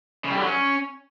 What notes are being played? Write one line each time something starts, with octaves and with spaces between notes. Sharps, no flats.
C#3
G3
D3
F#3
C#4